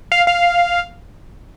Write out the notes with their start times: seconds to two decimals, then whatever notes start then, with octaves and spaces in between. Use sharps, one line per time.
0.12 F5
0.27 F5